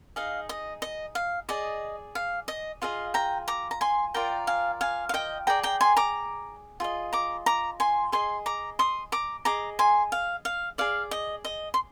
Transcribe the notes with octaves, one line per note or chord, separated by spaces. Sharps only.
D#4 G#4 D#5 F5
D#5
D#5
F5
G#4 D5 D#5
F5
D#5
F4 G#4 D#5 F5
G5 A#5
A#5 D6
A#5
G#5 C6
F4 A#4 D5 G5 A#5
F5 G#5
F5 G#5
F5
D#5 G5
G#4 D5 G5 A#5
G5 A#5
G#5 C6
A#5 D6
F4 G#4 D#5
A#5 D6
A#5 D6
G#5 C6
G#4 D#5 G#5 C6
A#5 D6
C6 D#6
A#5 D6
G#4 D#5 A#5 D6
G#5 C6
F5
F5
G#4 D5 F5
D#5
D#5
C6